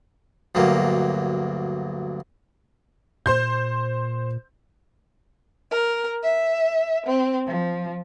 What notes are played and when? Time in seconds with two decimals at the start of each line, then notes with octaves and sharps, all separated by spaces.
0.55 D2 G2 F#3 A#3
3.26 A#2 C5 C6 G6
5.69 A#4
6.22 E5
7.06 C4
7.46 F3